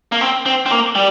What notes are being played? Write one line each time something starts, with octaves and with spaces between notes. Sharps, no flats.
A#3
C4
C4
C4
A#3
G3